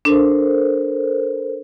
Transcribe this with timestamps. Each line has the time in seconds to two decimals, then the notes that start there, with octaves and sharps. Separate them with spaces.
0.05 D4 A4 A#4 C5